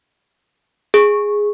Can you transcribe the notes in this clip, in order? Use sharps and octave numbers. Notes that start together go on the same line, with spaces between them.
G#4